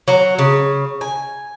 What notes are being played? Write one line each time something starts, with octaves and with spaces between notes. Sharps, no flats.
F#3
C#3
G#5